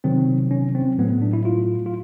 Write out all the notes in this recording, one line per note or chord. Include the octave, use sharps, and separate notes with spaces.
C3 D#3 F#3 C4
C#4
C4
A2 F#3 A3 B3
D4
E4
F4
F4